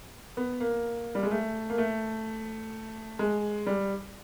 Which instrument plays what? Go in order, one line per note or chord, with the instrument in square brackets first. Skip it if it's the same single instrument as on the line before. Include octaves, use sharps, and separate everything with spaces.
[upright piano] B3
A#3
G3
G#3
A3
A#3
A3
G#3
G3